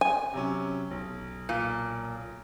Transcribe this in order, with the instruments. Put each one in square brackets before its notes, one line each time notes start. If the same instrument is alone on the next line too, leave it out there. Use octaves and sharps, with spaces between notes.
[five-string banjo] G#5
[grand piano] C3 F#3 C#4
B1
[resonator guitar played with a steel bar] A#2